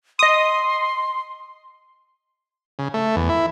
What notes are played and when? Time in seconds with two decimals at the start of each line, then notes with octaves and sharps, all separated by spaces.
0.19 D#5 C6 D#6
2.79 C#3
2.94 A3
3.16 E2
3.29 E4